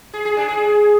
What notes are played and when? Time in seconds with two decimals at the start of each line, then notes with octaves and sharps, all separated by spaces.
0.13 G#4
0.25 G#4
0.37 D4
0.48 G#4